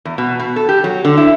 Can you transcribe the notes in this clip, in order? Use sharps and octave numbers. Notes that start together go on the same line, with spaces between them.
E2
B2
B2
A4
G4
F#3
D3
E4